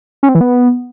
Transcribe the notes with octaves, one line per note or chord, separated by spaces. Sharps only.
C#4
C4
E3
B3